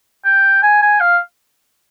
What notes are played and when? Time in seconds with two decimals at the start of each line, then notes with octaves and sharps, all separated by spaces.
0.25 G5
0.63 G#5
0.82 G#5
1.00 F5